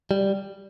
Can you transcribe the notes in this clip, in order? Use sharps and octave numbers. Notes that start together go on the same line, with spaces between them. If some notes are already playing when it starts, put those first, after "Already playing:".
G3